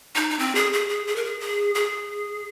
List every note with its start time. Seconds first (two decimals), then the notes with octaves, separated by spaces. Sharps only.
0.16 D#4
0.30 D#4
0.39 C4
0.55 G#4
0.73 G#4
0.89 G#4
1.07 G#4
1.16 A#4
1.25 G#4
1.40 G#4
1.75 G#4